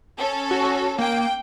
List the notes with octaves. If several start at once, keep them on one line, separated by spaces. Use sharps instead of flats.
C#4 A4
F#4
A#3 G5